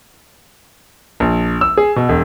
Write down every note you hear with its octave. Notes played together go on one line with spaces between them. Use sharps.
A#1
E6
G#4
B2
E1